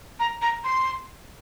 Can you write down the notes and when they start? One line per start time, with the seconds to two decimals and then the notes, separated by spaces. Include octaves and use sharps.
0.20 A#5
0.42 A#5
0.64 C6